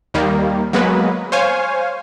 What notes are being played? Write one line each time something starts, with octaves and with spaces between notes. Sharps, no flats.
D#2 D#3 G3 A#3
F#3 G#3 A#3 B3 B4
C5 C#5 F5 G#5